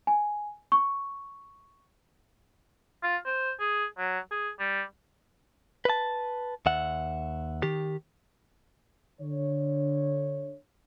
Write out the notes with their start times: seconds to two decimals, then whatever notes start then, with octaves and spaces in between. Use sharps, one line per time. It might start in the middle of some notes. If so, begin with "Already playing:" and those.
0.07 G#5
0.72 C#6
3.03 F4
3.26 C5
3.60 G#4
3.98 F#3
4.31 G#4
4.60 G3
5.85 B4 A5
6.66 D#2 E5 F#5
7.63 D#3 G4
9.21 D3 C#5